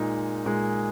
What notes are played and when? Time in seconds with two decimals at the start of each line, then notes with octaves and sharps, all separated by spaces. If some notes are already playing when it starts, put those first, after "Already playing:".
Already playing: A#2 G#3 D#4
0.46 A#2 G#3 D#4